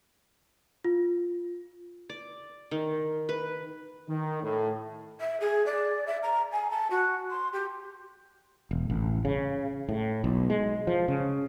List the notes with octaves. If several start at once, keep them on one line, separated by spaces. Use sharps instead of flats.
F4
D5
D#3
B4
D#3
A2
E5
G#4
D5
E5
A#5
G#5
A5
F#4
C6
G4
E1
A1
C#3
A2
B1
G#3
F3
C#3